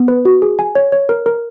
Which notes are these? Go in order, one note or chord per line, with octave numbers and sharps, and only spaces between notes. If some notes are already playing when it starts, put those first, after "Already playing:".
Already playing: B3
B4
F#4
G#4
G#5
C#5
C#5
A#4
A#4